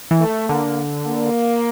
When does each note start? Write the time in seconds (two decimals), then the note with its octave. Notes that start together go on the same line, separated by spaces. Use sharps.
0.11 E3
0.20 A3
0.49 D3 A#3
1.07 A#3